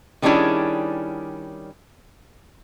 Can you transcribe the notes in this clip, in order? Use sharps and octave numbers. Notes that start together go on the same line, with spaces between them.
D#3 G3 C#4 D4 E4 G#4